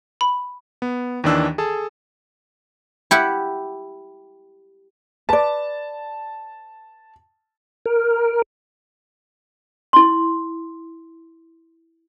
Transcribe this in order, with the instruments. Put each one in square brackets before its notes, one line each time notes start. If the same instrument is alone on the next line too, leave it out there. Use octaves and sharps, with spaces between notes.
[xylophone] B5
[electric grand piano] B3
D#2 D#3 E3 D4 E6
G#4 A4 A5
[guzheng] E4 G4 F#5
[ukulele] B4 D5 [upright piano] A5
[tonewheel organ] A#4
[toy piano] E4 C6